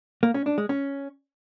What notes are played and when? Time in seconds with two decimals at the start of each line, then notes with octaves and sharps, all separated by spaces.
0.23 A#3
0.34 C#4
0.46 D4
0.58 G#3
0.69 C#4